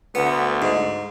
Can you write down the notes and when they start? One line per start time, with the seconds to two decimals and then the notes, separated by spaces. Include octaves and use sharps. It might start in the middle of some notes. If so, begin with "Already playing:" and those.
0.15 D2 B3
0.62 G#2